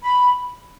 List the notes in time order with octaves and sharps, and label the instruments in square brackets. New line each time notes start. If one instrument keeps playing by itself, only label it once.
[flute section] B5